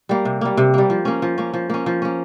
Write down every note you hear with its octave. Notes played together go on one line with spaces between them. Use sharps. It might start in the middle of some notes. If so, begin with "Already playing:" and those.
G3 A#3
C3
G3 A#3
C3
G3 A#3
F3
A#3 C#4
F3
A#3 C#4
F3
A#3 C#4
F3
A#3 C#4